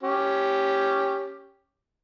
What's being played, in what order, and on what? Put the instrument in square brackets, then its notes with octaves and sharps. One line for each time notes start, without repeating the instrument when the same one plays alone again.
[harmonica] C#4 G4